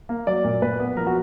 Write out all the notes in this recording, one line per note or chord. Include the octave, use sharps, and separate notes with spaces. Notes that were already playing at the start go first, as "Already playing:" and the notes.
A#3
F#3 D5
A#2
A#2 B4
B3
F3 A#4
F#4